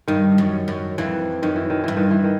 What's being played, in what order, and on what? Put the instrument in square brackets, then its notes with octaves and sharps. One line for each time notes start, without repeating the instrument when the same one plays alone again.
[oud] G2 [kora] D#3
[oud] F#2
F#2
[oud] F2 [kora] E3
[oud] F#2 [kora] D#3
[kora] E3
D#3
[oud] G2 [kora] E3
[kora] D#3
E3
D#3